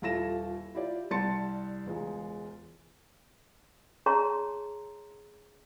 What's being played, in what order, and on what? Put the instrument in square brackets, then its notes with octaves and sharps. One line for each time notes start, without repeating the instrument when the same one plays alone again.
[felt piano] D#1 E4 F4 A4 A#6 E7
E4 F4 G4 D5
C2 G3 A5 C6 A6 C#7
E1 C#2 G#3
[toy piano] G#4 C#5 A5 A#5 C6